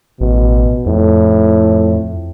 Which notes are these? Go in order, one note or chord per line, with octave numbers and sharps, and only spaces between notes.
A1 B2
F2 A2